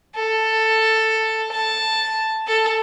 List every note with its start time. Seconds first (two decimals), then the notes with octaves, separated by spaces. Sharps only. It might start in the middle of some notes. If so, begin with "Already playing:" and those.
0.15 A4
1.52 A5
2.48 A4